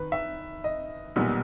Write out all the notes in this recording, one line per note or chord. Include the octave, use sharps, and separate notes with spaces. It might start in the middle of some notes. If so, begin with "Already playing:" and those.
Already playing: D#3 B4
E5
D#5
B1 A#2 G3 B3